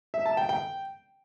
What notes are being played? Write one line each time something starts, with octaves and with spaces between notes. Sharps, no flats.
E5
A5
G5
G5